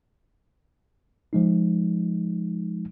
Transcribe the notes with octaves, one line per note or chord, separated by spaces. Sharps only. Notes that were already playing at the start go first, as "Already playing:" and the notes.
F3 G#3 D#4